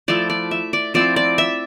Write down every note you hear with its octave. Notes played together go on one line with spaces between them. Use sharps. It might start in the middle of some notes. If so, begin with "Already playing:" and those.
F3 A3 E4 D5
D5
E5
D5
F3 C4 E4 D5
D5
E5